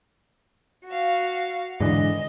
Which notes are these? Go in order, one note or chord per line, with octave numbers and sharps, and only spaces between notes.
F#4 F5
G#2 D3 E3 D#5